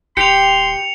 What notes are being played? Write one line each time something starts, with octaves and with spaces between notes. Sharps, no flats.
D#1 G4 C6 C#7 F7